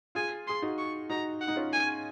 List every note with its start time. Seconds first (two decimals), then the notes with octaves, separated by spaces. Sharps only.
0.15 F4 G#4 G#5
0.47 G#4 C6
0.62 D#4 F#4
0.78 C#6
1.10 D#4 F#4 A#5
1.41 F#5
1.48 D#4
1.56 C#4 F4
1.73 G#5